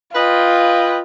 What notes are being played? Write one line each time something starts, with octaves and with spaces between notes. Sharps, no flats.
F4 B4 D#5 G5